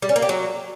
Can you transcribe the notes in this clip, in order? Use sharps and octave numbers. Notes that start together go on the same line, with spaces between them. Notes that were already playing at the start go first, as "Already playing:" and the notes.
G3
C#4
A#3
G4
F#3